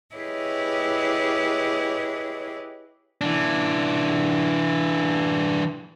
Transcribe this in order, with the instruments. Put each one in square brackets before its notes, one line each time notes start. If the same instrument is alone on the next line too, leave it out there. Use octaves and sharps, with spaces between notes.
[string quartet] E4 G4 G#4 B4 C#5 D#5
[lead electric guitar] E3 D4